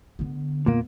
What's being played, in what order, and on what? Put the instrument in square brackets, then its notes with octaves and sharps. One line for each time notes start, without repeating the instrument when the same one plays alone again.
[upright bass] D3 B3
[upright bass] E2 B3 [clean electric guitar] A#2 A#3